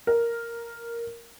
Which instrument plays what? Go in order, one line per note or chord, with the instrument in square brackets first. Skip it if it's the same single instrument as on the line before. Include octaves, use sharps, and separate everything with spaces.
[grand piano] A#4